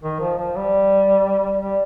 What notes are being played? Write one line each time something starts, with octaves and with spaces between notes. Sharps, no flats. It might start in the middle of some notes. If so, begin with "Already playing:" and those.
D#3
F3
F3
G3
G3